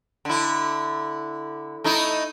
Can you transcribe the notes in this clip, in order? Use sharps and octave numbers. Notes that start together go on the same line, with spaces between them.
D3 E4
A3 D#4 E4